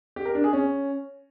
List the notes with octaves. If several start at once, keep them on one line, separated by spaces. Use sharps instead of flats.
G4
A#4
D4
G#4
C#4